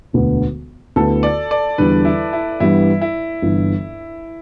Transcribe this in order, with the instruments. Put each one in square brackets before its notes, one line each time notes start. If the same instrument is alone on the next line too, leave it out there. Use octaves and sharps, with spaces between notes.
[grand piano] E1 D2 D3 B3
[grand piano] D2 D3 B3 E4 [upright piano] A4
[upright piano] D5
D5
[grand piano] E2 D3 G3 D4 [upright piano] B4
[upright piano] E4
E4
[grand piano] G2 E3 G3 B3 [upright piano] E4
[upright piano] E4
[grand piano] G1 G2 E3